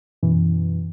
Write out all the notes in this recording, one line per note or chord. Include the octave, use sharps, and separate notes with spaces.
F#2 B2 E3